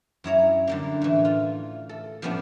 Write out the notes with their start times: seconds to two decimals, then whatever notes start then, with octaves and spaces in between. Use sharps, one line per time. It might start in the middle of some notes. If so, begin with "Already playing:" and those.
0.24 F#2 E4 C#5 A#5
0.67 D3 G3 A#3
1.02 A2 E3
1.25 F4
1.89 A4
2.22 F3 G3 B3 C#4 D4